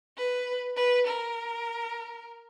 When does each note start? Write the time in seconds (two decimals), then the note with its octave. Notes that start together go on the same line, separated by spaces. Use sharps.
0.17 B4
0.76 B4
1.08 A#4